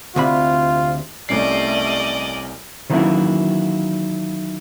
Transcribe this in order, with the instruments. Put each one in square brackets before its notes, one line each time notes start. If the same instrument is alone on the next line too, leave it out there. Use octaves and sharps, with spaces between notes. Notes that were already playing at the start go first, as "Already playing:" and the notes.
[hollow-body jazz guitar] D2 C3 B5 [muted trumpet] F4
[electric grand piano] C2 C#4 C7 [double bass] G3 A3 [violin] D5 D#5
[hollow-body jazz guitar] D#3 E3 F#3 A#3 C#4 E4